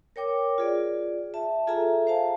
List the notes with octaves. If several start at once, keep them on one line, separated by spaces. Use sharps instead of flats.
A#4 C#5 G5 D6
F4 G#4 D5
E5 A5
F4 G#4 A4 E5 G#5 A#5
C5 F5 A5